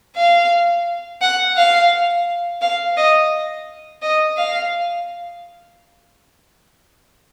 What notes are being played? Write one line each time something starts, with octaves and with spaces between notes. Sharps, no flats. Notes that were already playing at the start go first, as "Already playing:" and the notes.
F5
F#5
F5
F5
D#5
D#5
F5